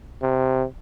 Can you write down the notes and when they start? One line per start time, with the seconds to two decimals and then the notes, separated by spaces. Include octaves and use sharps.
0.22 C3